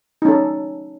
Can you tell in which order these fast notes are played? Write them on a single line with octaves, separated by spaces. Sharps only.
D#4 C#4 A4